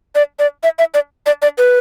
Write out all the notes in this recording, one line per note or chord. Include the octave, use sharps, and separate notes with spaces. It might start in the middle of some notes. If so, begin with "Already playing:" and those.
D5
D5
E5
E5
D5
D5
D5
B4